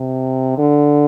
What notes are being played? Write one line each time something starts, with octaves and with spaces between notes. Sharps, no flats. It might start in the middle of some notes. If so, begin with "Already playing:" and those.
Already playing: C3
D3